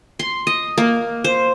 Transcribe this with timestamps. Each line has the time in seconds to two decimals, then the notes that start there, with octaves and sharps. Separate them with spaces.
0.19 C6
0.47 D#5
0.78 A#3
1.24 C5